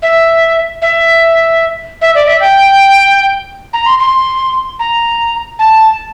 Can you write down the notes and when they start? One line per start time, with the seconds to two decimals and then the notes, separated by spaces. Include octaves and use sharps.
0.02 E5
0.82 E5
2.01 E5
2.15 D5
2.28 E5
2.41 G5
3.73 A#5
3.86 C6
3.99 C6
4.79 A#5
5.59 A5